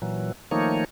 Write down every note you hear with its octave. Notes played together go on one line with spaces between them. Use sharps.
A#2 E3 F#3
D#3 F3 A3 A#3 D#4 C#5